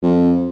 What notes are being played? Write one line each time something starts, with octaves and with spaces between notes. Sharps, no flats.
F2